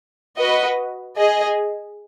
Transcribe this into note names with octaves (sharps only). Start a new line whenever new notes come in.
F#4 B4 D#5
G#4 D#5